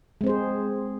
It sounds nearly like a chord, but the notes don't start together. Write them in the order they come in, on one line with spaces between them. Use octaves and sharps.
G#3 C4 C5 G#4